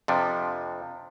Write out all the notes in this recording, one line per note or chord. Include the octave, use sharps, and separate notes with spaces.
F2 C3 F3 D4